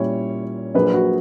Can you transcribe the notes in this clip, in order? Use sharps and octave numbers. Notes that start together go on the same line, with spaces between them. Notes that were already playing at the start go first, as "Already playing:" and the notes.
Already playing: A#2 G3 C#4 E4 C#5
A#1 A#2 F#3 A#3 B4
F#4